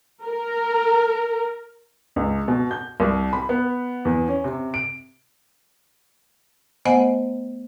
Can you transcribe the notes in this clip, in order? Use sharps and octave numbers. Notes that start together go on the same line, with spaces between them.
A#4
C#2
B2
G6
C2
B5
B3
E2
C#4
C3
D7
A3 B3 C5 D#5 F#5 G#5